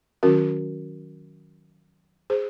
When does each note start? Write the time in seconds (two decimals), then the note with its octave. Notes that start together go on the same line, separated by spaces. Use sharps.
0.23 D#3 F#3 C#4 F#4 A#4
2.30 G#4 C5